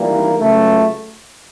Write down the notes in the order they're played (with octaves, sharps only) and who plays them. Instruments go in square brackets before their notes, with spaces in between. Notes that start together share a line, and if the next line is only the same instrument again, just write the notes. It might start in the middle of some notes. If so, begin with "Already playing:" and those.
Already playing: [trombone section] G#1 G2 E3 G3 A#3
C#2 C#3 F#3 A3